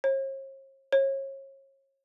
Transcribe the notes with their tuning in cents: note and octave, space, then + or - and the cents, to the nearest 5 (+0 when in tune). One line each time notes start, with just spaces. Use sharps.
C#5 -45
C#5 -35